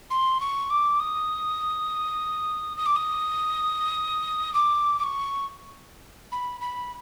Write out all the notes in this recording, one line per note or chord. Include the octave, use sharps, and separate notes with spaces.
C6
C#6
D6
D#6
D#6
D6
D#6
D6
D6
C#6
B5
B5